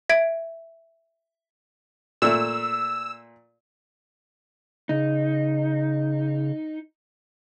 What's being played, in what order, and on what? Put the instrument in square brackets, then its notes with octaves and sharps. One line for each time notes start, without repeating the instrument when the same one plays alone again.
[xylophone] E5 G#6 D7
[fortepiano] A#2 A3 [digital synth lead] E6
[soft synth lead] C#3 [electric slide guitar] D#4